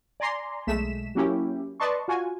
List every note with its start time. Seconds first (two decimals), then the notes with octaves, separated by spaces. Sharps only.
0.20 D5 G#5 A#5 C6
0.67 B1 G#3 A3 B6 E7
1.15 F#3 A#3 C#4 E4 G4
1.80 B4 D5 D#5 A5 C6 C#6
2.08 F4 F#4 G#5